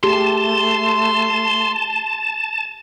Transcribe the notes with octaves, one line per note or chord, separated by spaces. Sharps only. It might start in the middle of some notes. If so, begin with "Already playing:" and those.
A3 G4 G#4 A5 C6